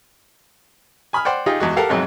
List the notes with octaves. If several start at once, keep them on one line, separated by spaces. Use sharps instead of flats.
G#5 B5 D#6 F6
C5 D5 F#5 G5
D#4 F4 G4 G#4 D#5 G5
E2 G#3 F#4
G4 A4 A#4 F5 F#5
B1 F2 G#2 C3 F#3 G#3